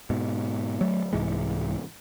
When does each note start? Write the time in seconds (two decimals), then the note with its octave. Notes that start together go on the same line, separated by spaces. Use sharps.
0.10 G#2 B2
0.81 F#3 A3
1.13 C2 G#2 E3 G#3